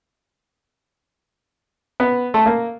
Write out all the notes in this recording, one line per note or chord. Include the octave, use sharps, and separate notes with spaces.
B3
A3
A#3